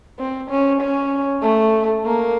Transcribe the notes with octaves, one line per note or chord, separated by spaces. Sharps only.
C4
C#4
C#4
A3
A#3